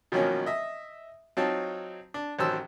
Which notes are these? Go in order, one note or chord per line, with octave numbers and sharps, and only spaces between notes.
B2 D#3 F3 F#3 A#3 C#4
D#5 E5
F#3 C4 D#4 F4 C#5 A5
D4
A1 D#3 F#3 C5 A5 E6